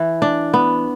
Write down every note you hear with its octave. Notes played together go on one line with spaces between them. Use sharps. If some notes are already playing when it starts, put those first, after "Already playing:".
Already playing: E3
D4
B3